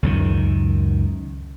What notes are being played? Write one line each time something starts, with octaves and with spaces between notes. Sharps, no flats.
C#2 F#2 D#3